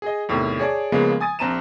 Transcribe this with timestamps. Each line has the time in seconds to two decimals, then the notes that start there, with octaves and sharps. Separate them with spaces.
0.02 G#4 D#5
0.29 E2 A2 C3 D#3
0.59 G#4 C#5 D5 A5
0.92 C#3 F3 G#3 A#3 B3
1.21 G#5 D#6 A6 D#7
1.39 A#1 C4 A5 A#5 D#7 E7